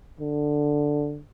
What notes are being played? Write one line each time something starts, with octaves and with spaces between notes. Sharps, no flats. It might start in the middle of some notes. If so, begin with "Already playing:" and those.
D3